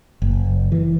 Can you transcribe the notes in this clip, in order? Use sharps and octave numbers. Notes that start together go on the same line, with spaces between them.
F#1
E3